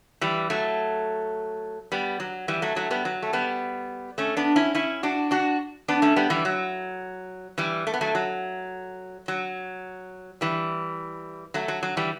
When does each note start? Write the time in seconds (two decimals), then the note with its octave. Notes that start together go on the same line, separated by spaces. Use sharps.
0.21 E3 G3
0.50 F#3 A3
1.92 G3 B3
2.20 F#3
2.48 E3 G3
2.62 F#3 A3
2.76 F#3 A3
2.91 G3 B3
3.05 F#3
3.23 A3
3.33 G3 B3
4.18 A3 C#4
4.37 B3 D4
4.56 C#4 E4
4.75 C#4 E4
5.03 D4 F#4
5.31 D4 F#4
5.88 B3 D4
6.02 A3 C#4
6.16 G3 B3
6.30 E3 G3
6.45 F#3
7.58 E3 G3
7.87 A3
7.94 B3
8.01 F#3 A3
8.15 F#3
9.28 F#3
10.41 E3 G3
11.54 F#3 A3
11.68 F#3
11.83 F#3
11.97 E3 G3